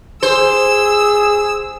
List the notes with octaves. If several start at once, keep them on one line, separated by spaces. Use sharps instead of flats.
G#4 C5 E6